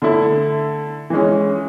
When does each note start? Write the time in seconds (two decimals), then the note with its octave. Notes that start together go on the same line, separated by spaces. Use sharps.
0.02 D3 A3 E4
1.10 E3 G#3 C#4